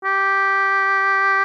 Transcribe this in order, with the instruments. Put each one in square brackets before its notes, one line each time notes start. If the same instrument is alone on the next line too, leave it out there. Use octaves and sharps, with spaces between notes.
[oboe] G4